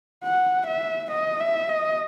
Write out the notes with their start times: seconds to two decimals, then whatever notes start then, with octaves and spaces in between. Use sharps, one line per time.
0.24 F#5
0.67 E5
1.11 D#5
1.40 E5
1.69 D#5